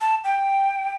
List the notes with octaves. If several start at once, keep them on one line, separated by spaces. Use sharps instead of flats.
A5
G5